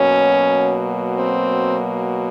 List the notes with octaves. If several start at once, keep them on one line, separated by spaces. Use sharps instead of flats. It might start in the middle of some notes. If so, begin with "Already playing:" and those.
Already playing: B2 F#3 A#3 C#4
C4